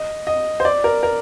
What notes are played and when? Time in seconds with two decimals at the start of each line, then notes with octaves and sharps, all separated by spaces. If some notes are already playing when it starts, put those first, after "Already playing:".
Already playing: D#5
0.27 D#5
0.60 C5
0.65 D5
0.84 A#4
1.03 A#4